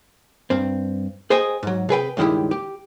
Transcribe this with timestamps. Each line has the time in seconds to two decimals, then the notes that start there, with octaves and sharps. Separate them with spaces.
0.50 G2 C4
1.30 G#4 C5 D#5 G5 G#5
1.63 G#2 F#3
1.89 C3 G#4 B4 G5
2.17 C#2 G2 D#3 G#3 E4 G4
2.51 G4